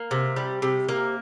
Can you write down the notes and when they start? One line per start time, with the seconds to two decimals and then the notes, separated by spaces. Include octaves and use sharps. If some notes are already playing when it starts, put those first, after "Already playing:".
Already playing: A#3
0.11 C3
0.36 G3
0.62 C3
0.89 A#3